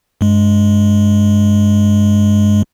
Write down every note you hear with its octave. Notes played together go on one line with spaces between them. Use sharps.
G2 G#3